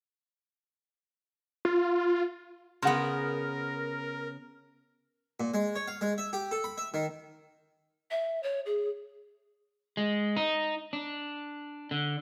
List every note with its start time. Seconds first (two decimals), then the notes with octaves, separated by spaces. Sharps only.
1.65 F4
2.82 C#3 B3 A#4 F#5 C6
5.40 A#2
5.54 G#3
5.76 C#5
5.88 F5
6.01 G#3
6.18 E5
6.33 G4
6.51 A4
6.64 B5
6.78 E5
6.94 D#3
8.11 E5
8.43 C#5
8.66 G#4
9.97 G#3
10.37 D#4
10.93 D4
11.91 D3